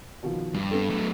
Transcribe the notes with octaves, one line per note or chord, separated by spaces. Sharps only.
B2 D#3 F3
G2
B3 D4 A4
F#3 A3